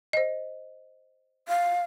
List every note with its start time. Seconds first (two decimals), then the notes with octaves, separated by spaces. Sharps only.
0.13 C5 D#5
1.48 F5